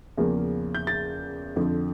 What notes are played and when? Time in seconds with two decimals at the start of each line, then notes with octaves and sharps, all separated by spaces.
0.18 E2 C#3 F3 A#3
0.75 G6
0.87 A6
1.56 F2 D3 F3